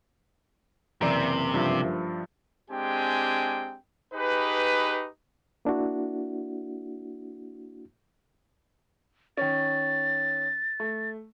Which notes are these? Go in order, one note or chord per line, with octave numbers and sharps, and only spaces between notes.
F#1 C3 E3 D5 A#5 E6
G2 F3 E5
G#3 C4 D4 G4 G5 G#5
D#4 G4 G#4 B4
A#3 D4 E4 F#4
D#3 C#4 A6
A3